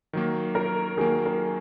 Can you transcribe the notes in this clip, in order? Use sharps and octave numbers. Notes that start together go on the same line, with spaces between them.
D#3 F#3 A#3
A#4
D#3 F#3 A#3 G#4
A#4